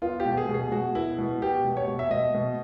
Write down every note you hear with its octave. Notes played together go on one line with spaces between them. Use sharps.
B3 F4
G4
B2
G#4
B2
G#4
B2 F#4
B3 E4
B2
B3 G4
B2
C#5
B2
E5
B2 D#5
B2